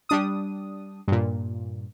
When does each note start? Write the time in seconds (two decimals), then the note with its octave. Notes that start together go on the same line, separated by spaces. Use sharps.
0.09 G3 D4 D#6
1.08 G2 A#2